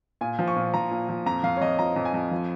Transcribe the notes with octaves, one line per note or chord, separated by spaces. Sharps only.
A#2 G#5
F3
C#6
A#2
F3 A#5
A#2
F3
F2 A#5
F2 F5
C#5
F2 D#5
F3 A#5
F2
G#5
F2
F3